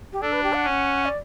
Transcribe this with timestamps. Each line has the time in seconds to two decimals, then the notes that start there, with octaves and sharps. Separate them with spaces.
0.13 G4
0.21 D4 A4
0.32 B4
0.43 G4
0.53 F#5
0.64 C#4
1.05 D5